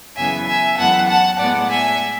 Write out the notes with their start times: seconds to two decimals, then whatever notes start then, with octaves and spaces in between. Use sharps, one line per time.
0.17 F#2 C#3 E3 B3 E5 G#5
0.47 E5 G#5
0.78 F#2 E3 G#3 B3 F#5 A5
1.08 F#5 A5
1.39 A2 G#3 B3 D5 F#5
1.70 E5 G#5